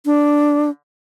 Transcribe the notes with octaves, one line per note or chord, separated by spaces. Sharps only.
D4